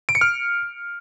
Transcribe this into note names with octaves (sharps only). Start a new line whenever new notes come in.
D7
C#7
F6